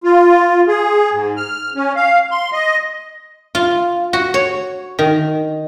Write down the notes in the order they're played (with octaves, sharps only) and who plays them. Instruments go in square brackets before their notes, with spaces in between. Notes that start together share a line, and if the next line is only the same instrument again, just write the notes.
[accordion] F4
G#4
G#2
F6
C#4
F5
C6
D#5
[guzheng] F4
F#4
C#5
D#3